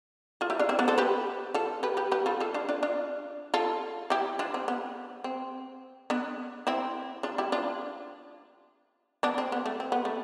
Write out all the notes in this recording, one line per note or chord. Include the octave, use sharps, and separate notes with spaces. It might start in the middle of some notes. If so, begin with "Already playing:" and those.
F4 A4
E4 G4
D4 F4
C4 E4
B3 D4
A4 C5
G4 B4
F4 A4
G4 B4
G4 B4
G4 B4
F4 A4
F4 A4
D4 F4
D4 F4
D4 F4
F4 A4
E4 G4
D4 F4
C4
B3
C4
B3 D4
C4 E4
D4 F4
E4 G4
D4 F4
B3 D4
C4
B3
A3
C4
B3
A3